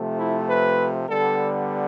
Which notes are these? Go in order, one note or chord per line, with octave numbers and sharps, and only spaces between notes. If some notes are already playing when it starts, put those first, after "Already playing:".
Already playing: C3 F3 A3
E4
B4
D3 G3 B3 A4